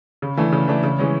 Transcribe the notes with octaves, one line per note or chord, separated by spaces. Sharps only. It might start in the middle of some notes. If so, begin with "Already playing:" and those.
C#3
E3 A3 D4
C#3
E3 A3 D4
C#3
E3 G#3 C#4